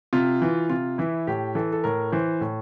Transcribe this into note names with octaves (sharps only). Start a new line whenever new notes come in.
C3 F4
E3
C3 F4
E3 E4
A2 G4
E3 A4
A4
A2 A#4
E3 C5
A2